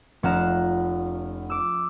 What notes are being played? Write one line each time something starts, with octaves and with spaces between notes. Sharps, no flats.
F1 C#4 F5 F#5 A#5 E7
D6 E6